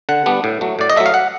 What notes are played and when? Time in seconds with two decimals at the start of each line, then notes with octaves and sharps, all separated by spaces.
0.09 D3 F#5
0.26 G3 B3 D4
0.44 A2
0.61 F#3 A3
0.79 A2 D5
0.90 D#5
0.96 F#3 A3 E5
1.06 F5
1.14 F#5